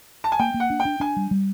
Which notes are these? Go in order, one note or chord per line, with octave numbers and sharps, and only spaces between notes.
A5
G#5
A#3 G5
A#3
F#5
D4
G5
D4
D4 G#5
G3
G3